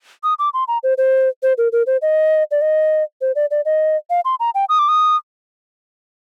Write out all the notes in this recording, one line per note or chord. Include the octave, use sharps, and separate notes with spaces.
D#6
D6
C6
A#5
C5
C5
C5
A#4
A#4
C5
D#5
D5
D#5
C5
D5
D5
D#5
F5
C6
A#5
G5
D#6
D6
D#6